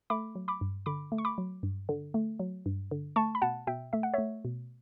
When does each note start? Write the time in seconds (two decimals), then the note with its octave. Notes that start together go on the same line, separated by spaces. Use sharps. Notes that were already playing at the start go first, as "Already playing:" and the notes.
0.10 A3 B5 D6
0.35 F#3
0.48 B5 D6
0.61 G2
0.86 D3 B5 D6
1.12 A3
1.18 C#6
1.25 B5 D6
1.38 F#3
1.63 G2
1.89 D3
2.14 A3
2.40 F#3
2.66 G2
2.91 D3
3.16 A3 A5 C#6
3.35 B5
3.42 B2 F#5 A5
3.67 B2 E5 G5
3.93 A3 E5
4.03 F#5
4.14 A3 C#5 E5
4.45 B2